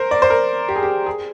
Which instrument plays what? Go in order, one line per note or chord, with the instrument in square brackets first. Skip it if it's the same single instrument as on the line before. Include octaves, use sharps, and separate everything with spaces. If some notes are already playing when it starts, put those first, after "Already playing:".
Already playing: [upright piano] A#4 C5
D5
C5
A#4
G4
G#4
G4
G#4